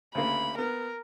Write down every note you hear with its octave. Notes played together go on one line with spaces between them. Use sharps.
D2 C#3 A#3 B5
B3 A#4